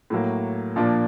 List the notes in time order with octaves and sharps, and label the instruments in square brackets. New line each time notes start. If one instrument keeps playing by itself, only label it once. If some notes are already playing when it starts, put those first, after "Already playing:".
[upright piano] A2 F#3 A#3
A#2 F3 A#3 D4